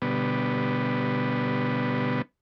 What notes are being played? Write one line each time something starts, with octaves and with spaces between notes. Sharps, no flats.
B2 D3 G3 B3